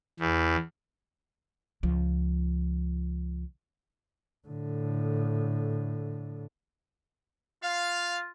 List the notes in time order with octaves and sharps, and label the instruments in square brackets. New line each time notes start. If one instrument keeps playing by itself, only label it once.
[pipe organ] E2
[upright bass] C#2 F3
[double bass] A2 D3
[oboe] F4 [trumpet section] F5